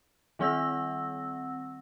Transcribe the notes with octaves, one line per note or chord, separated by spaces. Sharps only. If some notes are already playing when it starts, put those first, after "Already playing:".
D#3 G3 C4 F#5 E6 A#6